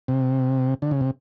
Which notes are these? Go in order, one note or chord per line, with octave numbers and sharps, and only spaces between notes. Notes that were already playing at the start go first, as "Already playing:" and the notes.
C3
D3
C#3
C3